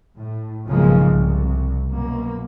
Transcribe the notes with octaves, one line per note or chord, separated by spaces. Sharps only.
A2
B1 G#2 C#3 F3 G#3 A#3
C2
F#2 B2 A#3